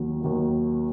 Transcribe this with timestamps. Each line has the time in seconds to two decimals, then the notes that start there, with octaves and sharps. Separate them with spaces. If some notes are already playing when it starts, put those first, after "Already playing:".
Already playing: D#2 D#3 F#3
0.22 D#2 D#3 F#3